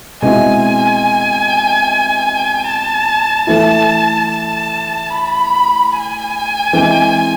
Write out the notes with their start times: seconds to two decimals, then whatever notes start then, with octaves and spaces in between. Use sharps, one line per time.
0.22 B2 G#3 C4 E4 G#5
2.66 A5
3.47 E3 A3 E4 A5
4.29 A5
5.10 B5
5.92 G#5
6.73 E3 G#3 C4